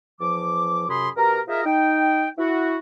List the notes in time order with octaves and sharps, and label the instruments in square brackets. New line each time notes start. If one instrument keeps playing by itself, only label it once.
[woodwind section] E2 F3 D6
F#2 C3 G#4 B5 C6
B2 G4 A#4
F4 G#4 A#4 D#5 E5
D#4 G5
E4 F#4